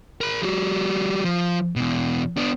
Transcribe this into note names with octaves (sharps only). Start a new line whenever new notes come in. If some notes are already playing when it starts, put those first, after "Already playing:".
A#4 B5
G3 F#4
F3
E2 B2
B3 D4